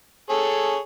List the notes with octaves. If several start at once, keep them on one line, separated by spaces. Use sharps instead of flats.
G#4 A4 C#5